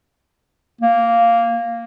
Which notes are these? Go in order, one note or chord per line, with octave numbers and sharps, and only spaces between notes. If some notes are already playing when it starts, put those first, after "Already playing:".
A#3